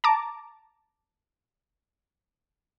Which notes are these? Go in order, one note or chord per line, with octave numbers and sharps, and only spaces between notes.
A5 A#5 D6